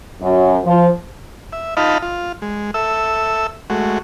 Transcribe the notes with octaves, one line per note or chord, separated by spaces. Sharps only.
F#2
F3
E5
D#4 F4 D#5 F5 A5 B5
F4
G#3
A4 E5 E6
G#3 A3 F#4